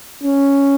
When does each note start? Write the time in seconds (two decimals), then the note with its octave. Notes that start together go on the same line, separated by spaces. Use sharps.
0.24 C#4